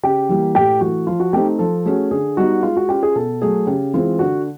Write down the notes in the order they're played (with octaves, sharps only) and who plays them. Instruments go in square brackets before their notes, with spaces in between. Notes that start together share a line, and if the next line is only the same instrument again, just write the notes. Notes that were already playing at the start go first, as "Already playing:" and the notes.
[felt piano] C#3 [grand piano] G4
[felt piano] E3 G3 A#3
[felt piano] A2 [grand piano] G4
[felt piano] E3 A3 [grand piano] F#4
[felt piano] F3 [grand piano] F4
[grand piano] F#4
[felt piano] A3 C4 D#4 [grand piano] G4
[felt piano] F3 [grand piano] A4
[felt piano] A3 C#4 F#4 [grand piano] G#4
[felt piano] D3 [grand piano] G#4
[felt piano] G3 B3 D#4 [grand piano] F#4
[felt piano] G#3 [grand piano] F4
[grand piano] F#4
[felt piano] C#4 F4 [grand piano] G4
[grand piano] G#4
[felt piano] B2 [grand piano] A4
[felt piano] F#3 A3 [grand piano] G#4
[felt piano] C#3 [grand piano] G4
[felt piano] E3 G#3 C4 [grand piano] F4
[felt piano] D3 [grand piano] F#4